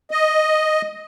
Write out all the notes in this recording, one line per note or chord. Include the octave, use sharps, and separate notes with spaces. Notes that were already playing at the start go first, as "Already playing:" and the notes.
D#5